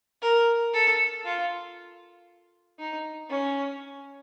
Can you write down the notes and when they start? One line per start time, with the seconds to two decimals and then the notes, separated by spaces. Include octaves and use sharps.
0.22 A#4
0.74 A4
1.25 F4
2.79 D#4
3.30 C#4